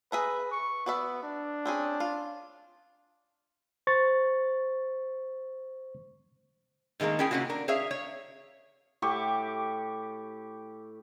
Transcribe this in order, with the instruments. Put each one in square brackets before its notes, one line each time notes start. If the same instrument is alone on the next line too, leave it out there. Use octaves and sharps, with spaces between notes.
[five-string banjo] G#4 E5 A#5 [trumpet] B4
[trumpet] C#6
[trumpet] B3 [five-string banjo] F#4 D5 E5
[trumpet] D4
[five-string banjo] C4 C#4 G#4
F4
[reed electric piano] C5 C#6 A6
[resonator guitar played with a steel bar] A2 D#3 G#3 A#3 A#4
C#4 E4 G#4 A#4 G5
C3 A#3 C#4 F4 F#4
D4 A#4
G#4 C#5 E5 F5
C#5
[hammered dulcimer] A2 G4 C#6 D6